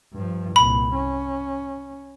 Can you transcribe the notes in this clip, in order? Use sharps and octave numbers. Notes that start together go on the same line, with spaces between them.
G2 F3
C2 A#2 B5
C#4